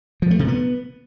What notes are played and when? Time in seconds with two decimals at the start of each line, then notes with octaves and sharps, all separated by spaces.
0.22 F3
0.31 A3
0.39 C3
0.48 B3